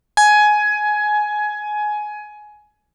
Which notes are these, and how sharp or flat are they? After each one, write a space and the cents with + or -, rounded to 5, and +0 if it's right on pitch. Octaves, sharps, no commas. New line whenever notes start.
G#5 +15